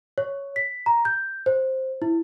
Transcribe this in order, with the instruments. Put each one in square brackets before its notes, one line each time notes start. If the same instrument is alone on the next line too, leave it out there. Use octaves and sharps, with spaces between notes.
[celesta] C#5
B6
A#5
G6
C5
E4